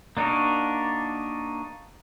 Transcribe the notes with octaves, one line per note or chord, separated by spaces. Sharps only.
A#3 D4 D#4 F#4 A#4